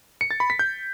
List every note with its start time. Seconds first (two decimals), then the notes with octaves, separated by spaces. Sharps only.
0.21 C#7
0.31 A6
0.40 B5
0.50 B6
0.59 G6